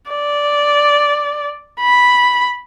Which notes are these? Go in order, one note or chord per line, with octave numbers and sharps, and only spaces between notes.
D5
B5